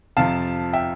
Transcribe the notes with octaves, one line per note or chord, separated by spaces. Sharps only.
F2 C3 F3 F5 A5
E5 G5